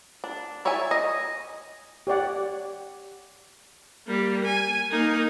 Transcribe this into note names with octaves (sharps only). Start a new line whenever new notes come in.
D4
E4 C#5 D5 E5 G#5
D#5
G4 C#5 D5 F#5
G3 A#3
G#5
A#3 D#4